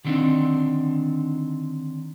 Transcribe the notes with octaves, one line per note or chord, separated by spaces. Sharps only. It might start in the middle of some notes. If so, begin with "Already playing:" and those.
D3 D#3 G3 C4 D4 D#4